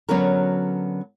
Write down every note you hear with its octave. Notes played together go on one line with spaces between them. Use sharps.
D3 F#3 B3 C#4 F#4 A#4